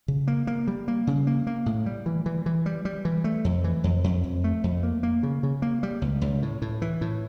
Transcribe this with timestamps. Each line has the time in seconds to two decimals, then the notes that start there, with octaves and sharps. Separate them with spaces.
0.08 C#3
0.28 A#3
0.47 A#3
0.68 G3
0.88 A#3
1.07 C#3
1.27 A#3
1.47 A#3
1.66 A2
1.86 G3
2.06 E3
2.26 E3
2.46 E3
2.66 G3
2.85 G3
3.05 E3
3.24 A3
3.45 F2
3.64 E3
3.84 F2
4.04 F2
4.24 F2
4.44 A3
4.64 F2
4.83 A#3
5.03 A#3
5.23 C#3
5.43 C#3
5.62 A#3
5.83 G3
6.02 C#2
6.21 C#2
6.42 A2
6.62 A2
6.82 E3
7.01 A2